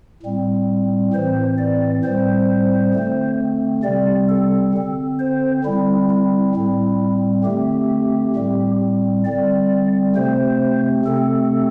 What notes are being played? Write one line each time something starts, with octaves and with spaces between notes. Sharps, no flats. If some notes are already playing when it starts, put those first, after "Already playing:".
A2 G3 C4
A2 E3 C4 C5
D5
A2 G3 C4 C5
D3 A3 C4
C3 G3 C4 D5
A4
D3 C4
C5
D3 G3 C4 E4
E4
A2 G3 C4
D3 A3 C4 G4
A2 G3 C4
D3 G3 C4 D5
C3 A3 C4 C5
C3 A3 C4 A4